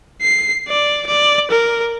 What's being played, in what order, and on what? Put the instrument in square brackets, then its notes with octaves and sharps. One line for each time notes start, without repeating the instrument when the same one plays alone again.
[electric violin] C7
D5
D5
A#4